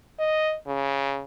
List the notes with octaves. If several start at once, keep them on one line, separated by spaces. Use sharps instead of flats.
D#5
C#3